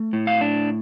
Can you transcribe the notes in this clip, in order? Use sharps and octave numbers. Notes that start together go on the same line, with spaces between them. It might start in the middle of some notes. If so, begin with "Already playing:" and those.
Already playing: A3
A2
F5
D4